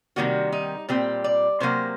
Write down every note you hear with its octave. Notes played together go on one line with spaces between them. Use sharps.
C3 D#3 G3 A#3 F#4
D#4
A#2 G3 C4 G4
D5
C3 F#3 A#3 C5